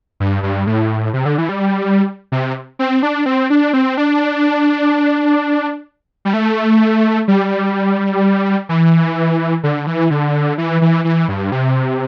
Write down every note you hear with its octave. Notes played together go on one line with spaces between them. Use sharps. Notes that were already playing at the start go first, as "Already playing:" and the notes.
G2
G2
A2
C3
D3
E3
G3
C3
C4
D4
C4
D4
C4
D4
G3
A3
G3
E3
D3
E3
D3
E3
E3
E3
G2
C3